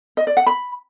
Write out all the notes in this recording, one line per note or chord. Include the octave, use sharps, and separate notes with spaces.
D#5
D5
F#5
B5